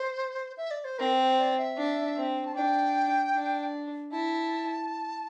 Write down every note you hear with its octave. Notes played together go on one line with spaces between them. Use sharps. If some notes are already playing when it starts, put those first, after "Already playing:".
Already playing: C5
E5
D5
C5
C4 A#4
C5
D5
E5
D4
C4
A5
D4 G5
D4
E4 A5